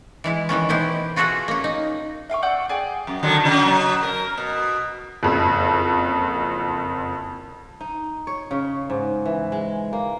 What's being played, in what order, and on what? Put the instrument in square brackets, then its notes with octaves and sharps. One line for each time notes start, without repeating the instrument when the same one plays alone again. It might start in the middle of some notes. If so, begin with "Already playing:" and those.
[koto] E3 G#3 E4
D#3 E3 B3 C#4
B2 B3 E4 G4 C5
F4 F#4 G#4 A4 E5 F#5
A#3 C#4
D#4
[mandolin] E5 F5 G5 C#6
D5 F#5 E6 G6
G#4 D5 G5
[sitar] F#2
D3 D#3 F#3
C#3 F#4
B2 F#3
A#4
B2
[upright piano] F#1 F2
[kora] D#4
C#5
C#3
G#2
E3
G#3
A#3